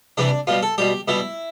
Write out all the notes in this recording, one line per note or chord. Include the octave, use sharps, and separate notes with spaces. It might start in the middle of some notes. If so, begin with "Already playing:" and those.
C3 E3 G3 D4
B2 G3 F4
A4
B2 G3 G4
B2 G3 E4